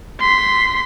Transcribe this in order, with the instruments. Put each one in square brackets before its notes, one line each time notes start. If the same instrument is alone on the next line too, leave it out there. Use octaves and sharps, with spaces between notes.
[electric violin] C6 B6